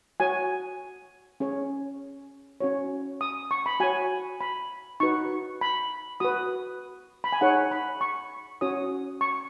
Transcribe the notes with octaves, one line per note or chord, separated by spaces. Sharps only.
F#4 C#5 G#5
C#4 G#4 C#5
C#4 F#4 C#5
D#6
C#6
B5
F#4 C#5 G#5
B5
D#4 F#4 B4 C#6
B5
F#4 B4 D#6
B5
G#5
D#4 G#4 C#5 F#5
B5
C#6
C#4 F#4 C#5 D#6
C#6